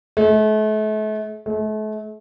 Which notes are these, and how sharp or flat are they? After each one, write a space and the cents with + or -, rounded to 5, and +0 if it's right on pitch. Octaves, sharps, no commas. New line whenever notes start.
A3 -40
A3 -40